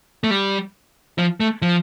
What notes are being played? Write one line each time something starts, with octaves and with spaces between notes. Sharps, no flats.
A3
G3
F3
A3
F3